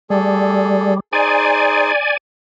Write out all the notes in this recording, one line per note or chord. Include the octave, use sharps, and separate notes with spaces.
G3 A3 G#4 A4
D#4 G#4 C5 D5 G#5